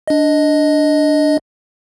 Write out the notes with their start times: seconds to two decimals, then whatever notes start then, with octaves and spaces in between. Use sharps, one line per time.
0.08 D4 D#5